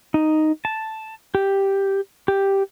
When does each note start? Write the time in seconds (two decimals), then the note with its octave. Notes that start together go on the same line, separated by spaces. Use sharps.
0.14 D#4
0.65 A5
1.35 G4
2.28 G4